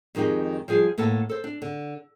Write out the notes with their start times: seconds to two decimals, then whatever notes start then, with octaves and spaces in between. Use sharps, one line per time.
0.15 F2 D#3 G#3 D#4 G4
0.68 F3 G3 G#4 F5
0.98 A2 A#3 B3 A4 A5
1.29 A4 C5
1.44 D4
1.62 D3